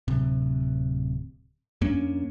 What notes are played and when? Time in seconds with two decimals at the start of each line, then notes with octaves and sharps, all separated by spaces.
0.08 D1 C3
1.81 F2 A#3 C#4 D4